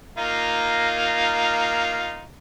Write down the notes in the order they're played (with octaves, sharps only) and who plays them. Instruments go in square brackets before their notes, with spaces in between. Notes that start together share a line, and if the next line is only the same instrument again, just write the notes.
[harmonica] A#3 D#4 F4